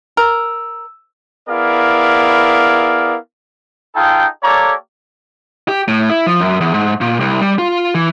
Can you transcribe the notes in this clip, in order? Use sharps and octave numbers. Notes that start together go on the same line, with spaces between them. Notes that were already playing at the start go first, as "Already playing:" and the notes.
A#4 E6
B3 E4 G#4 A#4 D5 F5
D#4 F4 G#4 A4 G5
A#3 G4 A4 C#5 D5 A#5
G4
A2
E4
F3
F#2
E2
G#2
A#2
C2
G3
F4
E3